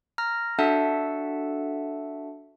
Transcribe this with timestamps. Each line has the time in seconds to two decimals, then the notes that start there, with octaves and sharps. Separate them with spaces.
0.18 A#5 F6 A#6
0.59 D4 F#4 A4 E5 F#5 A5